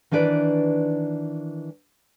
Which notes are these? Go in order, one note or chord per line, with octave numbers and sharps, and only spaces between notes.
D#3 E3 D4 B4 D5